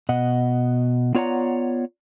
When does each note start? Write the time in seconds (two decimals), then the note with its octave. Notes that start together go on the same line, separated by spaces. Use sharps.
0.09 B2 D#5 F#5
1.15 B3 F4 C#5 D5 F#5 A#5